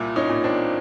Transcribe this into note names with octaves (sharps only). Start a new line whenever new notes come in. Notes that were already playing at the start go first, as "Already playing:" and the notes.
Already playing: C2 A#2
C#4 D#4
A#2
C4 D4